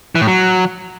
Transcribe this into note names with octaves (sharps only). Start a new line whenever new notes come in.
E3
A2
F#3